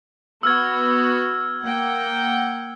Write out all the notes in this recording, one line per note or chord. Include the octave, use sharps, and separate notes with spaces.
B3 F#4 E6 F6 G#6
A#3 F#5 G5